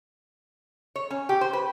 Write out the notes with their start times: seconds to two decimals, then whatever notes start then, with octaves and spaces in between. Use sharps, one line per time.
0.96 C#5
1.10 C#4
1.29 G4
1.41 C5
1.53 B4